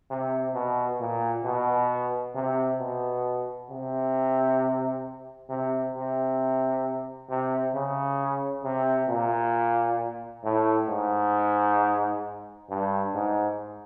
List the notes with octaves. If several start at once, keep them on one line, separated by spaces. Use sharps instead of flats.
C3
B2
A#2
B2
C3
B2
C3
C3
C3
C3
C#3
C3
A#2
A2
G#2
G2
G#2